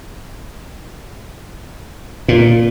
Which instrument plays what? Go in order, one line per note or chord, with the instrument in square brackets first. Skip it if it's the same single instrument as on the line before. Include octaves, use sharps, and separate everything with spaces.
[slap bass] A#2